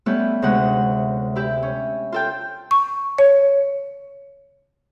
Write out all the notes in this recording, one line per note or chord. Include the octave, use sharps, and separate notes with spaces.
G3 A3 B3 C#4 E4 G4
D2 C3 G#3 C#4 F#5
E4 G4 E5
C#4
F4 A4 G5
C#6
C#5